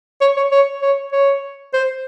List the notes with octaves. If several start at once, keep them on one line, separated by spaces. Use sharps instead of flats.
C#5
C#5
C#5
C#5
C#5
C5